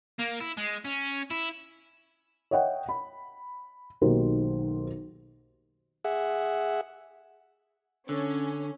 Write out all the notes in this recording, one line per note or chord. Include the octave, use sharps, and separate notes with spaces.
A#3
E4
G#3
C#4
E4
C#5 D#5 E5 F#5 G5
B5
B1 D#3 A#3 F#4 G4 C5
G#4 E5 F#5
D3 C#4